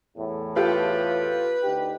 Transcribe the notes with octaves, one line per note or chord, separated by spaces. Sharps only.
E2 A2
F4 G4 A4 B4
D2 D#4 G4